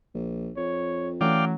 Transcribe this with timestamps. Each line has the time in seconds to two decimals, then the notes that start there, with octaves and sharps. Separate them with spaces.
0.14 A#1
0.57 F2 C#5
1.21 E3 F#3 A3 C#4 D5 F5 G5